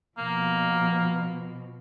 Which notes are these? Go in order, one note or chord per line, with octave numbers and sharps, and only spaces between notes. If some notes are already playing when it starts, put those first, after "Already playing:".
B2 F3 A#3